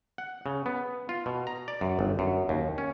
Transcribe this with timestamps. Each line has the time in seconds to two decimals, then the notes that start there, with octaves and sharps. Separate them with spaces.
0.18 F#5
0.46 C#3
0.66 B3
1.09 F4
1.26 B2
1.47 A#5
1.68 D5
1.81 F#2
1.99 G1
2.19 F#2
2.49 D#2
2.78 C#4